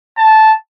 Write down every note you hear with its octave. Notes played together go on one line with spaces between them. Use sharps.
A5